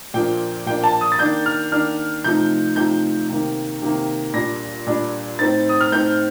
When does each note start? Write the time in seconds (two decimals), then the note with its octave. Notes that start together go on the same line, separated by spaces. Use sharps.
0.14 A#2 F3 A#3 D4 G5
0.66 A#2 F3 A#3 D4 G5
0.84 A5
1.01 D#6
1.12 A6
1.19 D#3 A#3 D4 G6
1.46 F6
1.71 D#3 A#3 D4 F6
2.24 C3 F3 A3 D#4 G6
2.76 C3 F3 A3 D#4 G6
3.29 C3 D#3 A#3
3.82 C3 D#3 A#3
4.34 A#2 G3 D4 A#6
4.87 A#2 G3 D4
5.39 A2 A3 C4 D#4 A6
5.69 D#6
5.81 F6
5.92 A2 A3 C4 D#4 G6